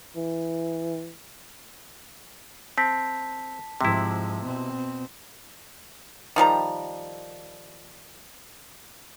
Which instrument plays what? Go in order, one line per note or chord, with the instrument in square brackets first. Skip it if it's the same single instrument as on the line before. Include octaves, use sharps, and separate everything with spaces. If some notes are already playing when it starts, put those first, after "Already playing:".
[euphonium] E3
[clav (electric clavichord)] C4 [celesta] A5 B6
[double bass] G#2 F3 [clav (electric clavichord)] C3 E4
[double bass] B2 C4
[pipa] D#3 F3 G3 A#5